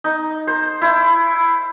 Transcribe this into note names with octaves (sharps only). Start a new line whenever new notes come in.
D#4
C5
E4